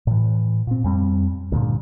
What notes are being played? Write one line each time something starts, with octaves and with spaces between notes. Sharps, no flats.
A2 E3
A#2 C4
F2 G3 C4
D2 G2 A#2